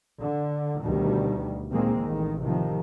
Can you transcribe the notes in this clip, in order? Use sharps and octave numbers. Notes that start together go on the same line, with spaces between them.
D3
D2 B2 D#3 G3
A#2 D#3 G#3 A#3 C4
A1 D#3
C3 D#3 F3